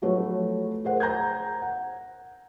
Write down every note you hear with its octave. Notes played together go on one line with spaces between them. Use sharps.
F3 F#3 A3 F#4 B4 C#5
G#4 A#4 C5 F#5
F#5 A#5 G6 G#6
F#5